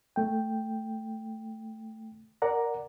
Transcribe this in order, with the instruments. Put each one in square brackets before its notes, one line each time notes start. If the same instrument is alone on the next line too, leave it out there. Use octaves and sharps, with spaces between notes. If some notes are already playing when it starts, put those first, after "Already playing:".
[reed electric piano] A3 G5
A#4 D5 F#5 A#5